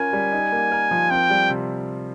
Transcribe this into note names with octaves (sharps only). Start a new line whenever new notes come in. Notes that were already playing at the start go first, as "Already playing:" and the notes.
Already playing: C#4 F4 A#4 G#5
G3
D#4
A#3
A#4
F3
C4 G5
G3
C3